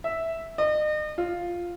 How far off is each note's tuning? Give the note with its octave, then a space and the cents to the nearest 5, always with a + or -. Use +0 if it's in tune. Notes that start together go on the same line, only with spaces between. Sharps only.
E5 -5
D#5 -40
F4 +0